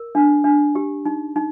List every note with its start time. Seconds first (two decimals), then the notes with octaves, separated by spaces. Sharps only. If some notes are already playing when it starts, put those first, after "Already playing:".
Already playing: A#4
0.15 D4
0.44 D4
0.75 G4
1.06 D#4
1.36 D#4